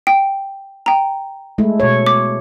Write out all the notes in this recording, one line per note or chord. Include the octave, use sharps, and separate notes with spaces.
G5
G5 A#5
G#3 A3 E4
B2 C#5
D6